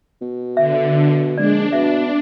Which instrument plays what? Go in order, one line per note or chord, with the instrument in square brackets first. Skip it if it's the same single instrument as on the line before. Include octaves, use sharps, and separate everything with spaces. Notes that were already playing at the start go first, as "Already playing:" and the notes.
[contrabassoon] B2
[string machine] D3 [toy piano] E5
[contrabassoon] A#1 [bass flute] G#3 [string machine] D4 [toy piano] D5
[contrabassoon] B2 [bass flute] B3 [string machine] D4 [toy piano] E5